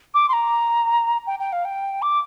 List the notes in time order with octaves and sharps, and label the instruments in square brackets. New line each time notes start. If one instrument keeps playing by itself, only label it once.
[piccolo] D6
C6
A#5
G5
G5
F5
G5
D6